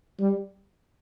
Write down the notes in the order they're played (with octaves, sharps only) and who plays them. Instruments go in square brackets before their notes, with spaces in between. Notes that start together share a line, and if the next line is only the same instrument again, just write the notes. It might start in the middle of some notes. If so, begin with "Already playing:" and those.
[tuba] G3